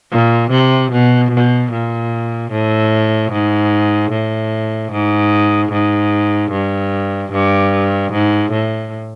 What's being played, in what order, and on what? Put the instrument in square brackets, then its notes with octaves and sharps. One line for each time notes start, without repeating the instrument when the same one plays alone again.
[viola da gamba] A#2
C3
B2
B2
A#2
A2
G#2
A2
G#2
G#2
G2
G2
G#2
A2